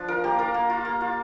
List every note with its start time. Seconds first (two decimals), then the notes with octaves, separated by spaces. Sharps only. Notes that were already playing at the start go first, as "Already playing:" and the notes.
Already playing: F3 D4
0.08 F4 A#4
0.24 A#3 G4
0.39 F4 A#4
0.54 A#3
0.70 F4
0.85 A#3
1.01 F4